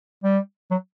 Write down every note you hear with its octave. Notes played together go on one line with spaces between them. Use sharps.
G3
F#3